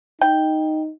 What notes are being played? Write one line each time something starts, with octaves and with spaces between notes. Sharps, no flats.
D#4 G5